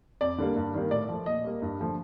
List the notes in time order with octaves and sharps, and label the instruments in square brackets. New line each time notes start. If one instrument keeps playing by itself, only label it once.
[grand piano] F2 D5
D3 G3 A#3
G2
D#3 G3 A#3
A2 D5
F3 A3
A#2 D#5
G3 A#3
G2
D3 F3 A3